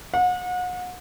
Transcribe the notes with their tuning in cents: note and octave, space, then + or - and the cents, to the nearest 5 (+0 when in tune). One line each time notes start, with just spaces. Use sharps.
F#5 -35